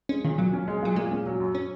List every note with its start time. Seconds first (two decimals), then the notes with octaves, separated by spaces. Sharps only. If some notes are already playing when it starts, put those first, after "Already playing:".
0.09 G#3 C#4
0.24 A#2 D#3
0.38 A#2 F#3
0.53 C#4
0.68 G#3
0.82 A#2 F#3
0.96 A#2 G#3
1.11 C#4
1.26 F#3
1.40 F#2
1.55 C#4